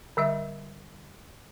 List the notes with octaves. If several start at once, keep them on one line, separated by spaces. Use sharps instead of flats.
D3 G3 E5